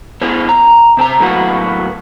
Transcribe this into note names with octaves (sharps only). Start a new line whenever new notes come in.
B3 E4 G#4 C5 C#5
A#5
C3 C4 A5 A#5
A2 D#3 F#3 A#3 B3 F#4